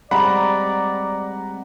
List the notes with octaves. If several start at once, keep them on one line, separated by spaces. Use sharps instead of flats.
G3 G#3 C4 D5 F#5 A#5 B5